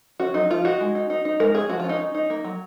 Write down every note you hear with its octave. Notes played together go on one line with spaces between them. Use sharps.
C#4 F#4
F#3 D#4
F3 F4
D#4 F#4
G#3
D#4
D#4
D#4
G#3 A#4
C#4 G#4
F3 F#4
F4
C#4
D#4
D#4
D#4
A#3
F#3